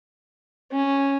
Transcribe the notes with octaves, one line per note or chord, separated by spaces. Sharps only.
C#4